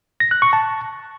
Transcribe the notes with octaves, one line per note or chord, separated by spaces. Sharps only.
A#6
F#6
C#6
A5